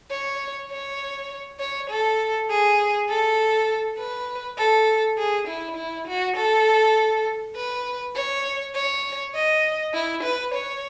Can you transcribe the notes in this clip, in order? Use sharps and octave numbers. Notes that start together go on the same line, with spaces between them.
C#5
C#5
C#5
A4
G#4
A4
B4
A4
G#4
E4
E4
F#4
A4
B4
C#5
C#5
D#5
E4
B4
C#5